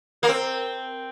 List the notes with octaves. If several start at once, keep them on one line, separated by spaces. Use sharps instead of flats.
A#3
C4